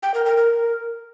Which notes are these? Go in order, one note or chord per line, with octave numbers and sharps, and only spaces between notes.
G5
A#4
A#4
A#4